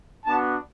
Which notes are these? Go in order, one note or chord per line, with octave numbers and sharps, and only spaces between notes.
B3 D4 F#4 A5